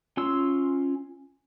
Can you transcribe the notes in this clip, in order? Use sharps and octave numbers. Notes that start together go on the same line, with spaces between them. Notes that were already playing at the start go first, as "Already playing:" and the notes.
C#4 F4 C6 E6